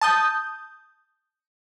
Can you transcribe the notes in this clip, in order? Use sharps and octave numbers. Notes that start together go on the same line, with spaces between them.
A5 D#6 G6